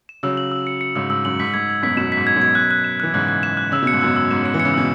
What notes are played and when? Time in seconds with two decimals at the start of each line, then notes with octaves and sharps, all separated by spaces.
0.09 E7
0.23 C#3 F#3 E6
0.37 F#7
0.52 E6
0.67 C#7
0.81 C#7
0.96 G#2 C#3 E6
1.10 G#2 E6
1.25 F#2 F#7
1.39 G#2 B6
1.54 G#2 G#6
1.69 G#6
1.83 F#2 B2 B6
1.97 F#2 B2 E7
2.12 G#2 B6
2.27 G#6
2.36 F#2 B2
2.42 G#6
2.55 F#6
2.71 F#6
2.84 E7
3.00 E3 F#6
3.14 G#2 C#3 F#6
3.28 F#6
3.43 E7
3.57 F#6
3.72 C#3 E6
3.82 B2 C#7
3.93 G#2
4.01 F#2 B2 E6
4.16 E6
4.31 G#2 E7
4.42 F#3 C#7
4.54 E3
4.60 C#7
4.65 C#3
4.74 B2 E6